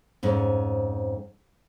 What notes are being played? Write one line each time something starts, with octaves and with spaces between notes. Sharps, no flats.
F2 G#2 C#4